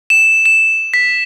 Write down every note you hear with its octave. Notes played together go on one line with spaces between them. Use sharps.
E7
E7
B6